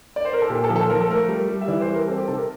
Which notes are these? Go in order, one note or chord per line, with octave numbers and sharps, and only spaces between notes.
D5
C5
A#4
A4
A#2 G4
A4
F3
A4
F3 A#4
A4
A3 A#4
G3
G3
E5
E3 D5
C5
G3
A#4
C4 A4
G4
C3 A4
A#4